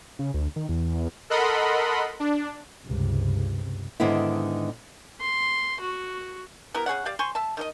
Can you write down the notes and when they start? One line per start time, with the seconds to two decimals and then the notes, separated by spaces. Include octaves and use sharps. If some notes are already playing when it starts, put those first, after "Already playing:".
0.19 C#3
0.34 D2
0.56 D#3
0.69 E2
1.30 A4 A#4 D#5 F#5 B5 C6
2.20 D4
2.85 C#2 G2 C3
4.00 G#2 D3 D#3 B3 E4
5.21 C6
5.80 F#4 C#6
6.74 B3 E4 G4 A#4
6.86 C#3 G#4 C#5 F#5
7.06 G4 D5 F5
7.19 C5 G#5 C6 C#6
7.35 E5 A5
7.57 D#3 G4 D#5